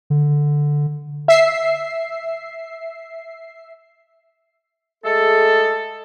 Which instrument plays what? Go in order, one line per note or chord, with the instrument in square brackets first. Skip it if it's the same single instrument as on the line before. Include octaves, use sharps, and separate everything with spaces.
[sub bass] D3
[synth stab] E5 C7
[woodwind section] G#3 A3 G#4 A4